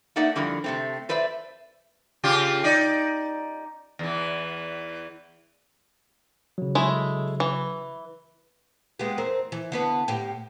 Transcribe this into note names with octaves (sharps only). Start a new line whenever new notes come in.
A3 A#3 D#4 D5 E5 F#5
F2 D3 G3 E4 A#4
C3 A3 C4
A4 B4 C5 D5 E5
C#3 F4 G4
D#4 D5
E2 E3
C#3 F#3
G#3 A3 E4
E3
G#3 B3 G4
E2 C4 A#4
E3
D3 B3 B4
A2 G4